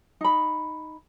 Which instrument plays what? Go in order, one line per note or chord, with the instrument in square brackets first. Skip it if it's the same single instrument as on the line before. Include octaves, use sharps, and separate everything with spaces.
[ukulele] D#4 B5